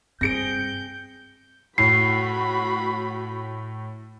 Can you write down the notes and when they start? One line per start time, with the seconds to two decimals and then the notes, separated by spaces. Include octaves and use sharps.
0.21 G2 C4 G#4 G6 A#6 C#7 D7
1.78 A2 F#4 B5 C7